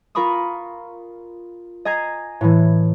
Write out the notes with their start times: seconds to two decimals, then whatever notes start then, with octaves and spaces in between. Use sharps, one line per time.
0.15 F4 A#4 A#5 B5 C#6 D#6
1.85 D#5 G#5 A#5 G#6 C7
2.41 A2 E3